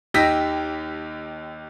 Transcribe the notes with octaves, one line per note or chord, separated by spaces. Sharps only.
D#2 D#4 G4 E6 A#6 B6